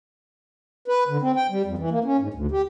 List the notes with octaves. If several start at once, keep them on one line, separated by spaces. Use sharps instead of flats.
B4
D3
C4
G5
G3
F2
E3
A#3
C#4
G#2
D2
G4